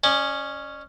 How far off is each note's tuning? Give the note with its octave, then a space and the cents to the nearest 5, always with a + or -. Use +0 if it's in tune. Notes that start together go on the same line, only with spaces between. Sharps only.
C#4 +0 D5 +45